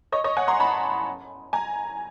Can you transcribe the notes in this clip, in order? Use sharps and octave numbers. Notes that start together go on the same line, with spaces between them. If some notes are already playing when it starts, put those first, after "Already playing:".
C#5 D#5
C#5 D#5
F#5 G#5
A#5 C6
A5 B5
G#5 A#5